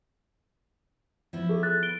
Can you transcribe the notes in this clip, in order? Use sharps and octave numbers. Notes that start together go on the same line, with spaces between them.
F3 B3 E4
G#4 A4
F#6 A6
D7 G7